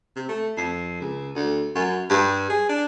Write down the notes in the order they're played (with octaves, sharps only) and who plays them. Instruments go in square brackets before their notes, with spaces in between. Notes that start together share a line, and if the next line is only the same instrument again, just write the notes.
[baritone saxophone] C3
A3
F2
C#2
D2
F#2
G2
G#4
D4